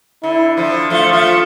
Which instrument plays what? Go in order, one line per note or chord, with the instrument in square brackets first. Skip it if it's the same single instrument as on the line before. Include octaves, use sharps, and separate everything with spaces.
[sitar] D3 [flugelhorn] E4
[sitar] D3 F3
[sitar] F3 A3 [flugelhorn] F4
[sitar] F3 A3